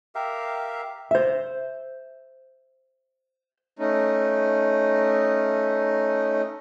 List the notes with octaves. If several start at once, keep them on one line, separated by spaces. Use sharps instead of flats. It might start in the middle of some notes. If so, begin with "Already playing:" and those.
G4 A#4 E5 F5
C5 E5
A3 C#4 D#4